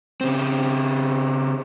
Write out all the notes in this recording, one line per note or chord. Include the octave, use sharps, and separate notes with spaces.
C#3 C4